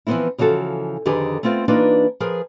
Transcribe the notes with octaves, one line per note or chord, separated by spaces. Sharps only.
E3 F3 A3 B3 C4 E4
C#3 E3 F3 F#4 A4
F2 D3 D#3 G4 G#4 B4
A3 B3 C4 F4 C5
E3 A#3 D4 D#4 F4 B4
F3 G#4 A#4 B4